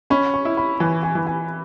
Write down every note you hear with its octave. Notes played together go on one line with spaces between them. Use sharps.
C#4 B5
C#6
E4
B5
E3 G#5
G#5
E3
G#5